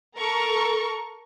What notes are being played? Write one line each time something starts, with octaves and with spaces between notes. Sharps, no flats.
A4 A#4 A#5 C#6